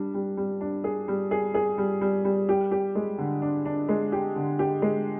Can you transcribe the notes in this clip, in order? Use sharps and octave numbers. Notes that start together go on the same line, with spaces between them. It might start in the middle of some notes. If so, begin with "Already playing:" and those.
Already playing: G3 D4
G3
G3
D4
G#4
G3
G#4
G#4
G3
G3
G3
G4
G4
G#3
D3
D4
D4
G#3
G4
D3
G4
G#3